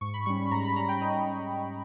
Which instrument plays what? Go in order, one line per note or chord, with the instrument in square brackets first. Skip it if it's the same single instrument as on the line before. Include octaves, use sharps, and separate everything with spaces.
[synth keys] G#2 C#6
B5
G3 C#4 C#6
B5
G#2 A#5
B5
G3 C#4 A#5
G5
G#2 D#5